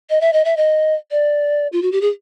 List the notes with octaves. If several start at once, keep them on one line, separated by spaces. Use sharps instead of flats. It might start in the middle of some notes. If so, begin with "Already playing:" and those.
D#5
E5
D#5
E5
D#5
D5
F4
F#4
G4
G#4